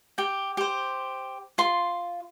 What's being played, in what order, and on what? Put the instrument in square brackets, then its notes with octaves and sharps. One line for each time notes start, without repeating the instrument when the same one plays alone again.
[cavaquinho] G4 G5
G4 C5
F4 C6